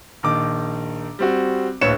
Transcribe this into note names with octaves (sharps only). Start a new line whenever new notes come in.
A#1 D#3 D6
G3 C4 F#4
D1 A#1 B4 C#5 C#7 E7